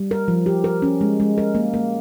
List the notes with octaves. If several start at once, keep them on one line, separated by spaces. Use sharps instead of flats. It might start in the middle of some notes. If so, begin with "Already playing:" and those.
Already playing: G3
A#4
F3
G4
A#4
C#4
G#3
G#3
A#4
A#3
A#3